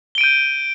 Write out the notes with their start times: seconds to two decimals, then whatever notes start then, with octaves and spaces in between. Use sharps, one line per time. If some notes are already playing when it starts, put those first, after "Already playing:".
0.15 G7
0.18 D7
0.21 D#7
0.24 G6